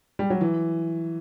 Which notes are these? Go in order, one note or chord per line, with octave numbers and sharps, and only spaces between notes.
G3
F#3
E3